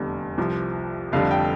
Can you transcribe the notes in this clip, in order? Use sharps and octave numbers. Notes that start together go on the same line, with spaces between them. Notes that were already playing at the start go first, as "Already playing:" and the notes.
Already playing: F1 E2 D3 G3
C2 C3 F3
F1 F2 D3 G3 F5
G5